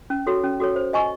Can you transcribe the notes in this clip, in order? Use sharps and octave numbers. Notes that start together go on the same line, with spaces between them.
C#4
F#4 A4 C#5
C#4
F#4 A4 C#5
C5
D#5 G#5 C#6